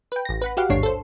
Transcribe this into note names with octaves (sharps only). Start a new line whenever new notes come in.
B4 G5
A1 A#6
B4 F#5 B5
F#4 G4 F5 F#5
A1 D#2 G#2 D4 C#5 C7
A4 C5